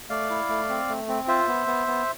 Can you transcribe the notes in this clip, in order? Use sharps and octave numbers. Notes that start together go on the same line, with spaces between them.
A3 D5 F5
E4
A3
C4
A3
C4
F4 C5 E5
B3
B3
B3